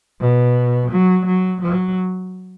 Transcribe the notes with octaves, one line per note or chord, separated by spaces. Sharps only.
B2
F#3
F#3
F#3